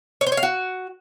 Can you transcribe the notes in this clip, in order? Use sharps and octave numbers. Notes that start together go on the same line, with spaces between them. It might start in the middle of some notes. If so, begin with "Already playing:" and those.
C#5
C5
C#5
F5
F#4